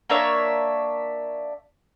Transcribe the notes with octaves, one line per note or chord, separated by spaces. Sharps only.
A#3 D4 C#5 E5